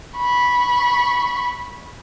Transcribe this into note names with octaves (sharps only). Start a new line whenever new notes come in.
B5 C#6